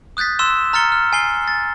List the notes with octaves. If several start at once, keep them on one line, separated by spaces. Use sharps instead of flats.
D#6 F#6 G6 A6 B6
C6 E6 E7 G7
A#5 F6 A6 C#7 G7
F6
G#5 C7 G7
A6